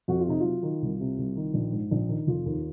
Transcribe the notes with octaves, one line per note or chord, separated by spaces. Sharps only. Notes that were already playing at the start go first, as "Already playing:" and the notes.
F2 F#4
F4
C3 D#4
F#3 F4
D#3
C2
C3
C2
D#3
A#1
G#2
A#1
D#3
F1 F4
D#2